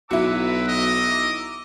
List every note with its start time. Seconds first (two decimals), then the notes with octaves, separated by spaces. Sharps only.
0.11 B1 E4 F#4 B4 A#5 D6 E6
0.68 D#5